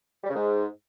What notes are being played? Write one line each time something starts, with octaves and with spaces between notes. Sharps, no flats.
G3
C#3
G#2